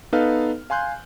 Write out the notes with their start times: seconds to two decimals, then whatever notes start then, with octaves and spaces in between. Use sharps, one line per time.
0.12 B3 D#4 A4 B4 F5 F6
0.70 F5 G#5 C6 F#6 G6